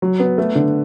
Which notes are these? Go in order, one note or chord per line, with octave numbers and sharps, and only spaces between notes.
F#3
B3
A3
D3